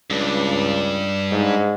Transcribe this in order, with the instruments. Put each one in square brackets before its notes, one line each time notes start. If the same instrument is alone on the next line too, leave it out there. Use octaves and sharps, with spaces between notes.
[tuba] C#2 [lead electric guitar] G2 D4
[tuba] G#2